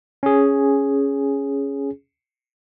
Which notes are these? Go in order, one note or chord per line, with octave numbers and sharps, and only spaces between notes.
C#4 G#4